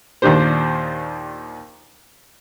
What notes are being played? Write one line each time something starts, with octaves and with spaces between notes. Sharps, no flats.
D#2 A#2 D#3 D4 G4 C5